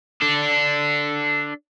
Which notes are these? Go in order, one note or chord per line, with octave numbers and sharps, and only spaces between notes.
D4 A4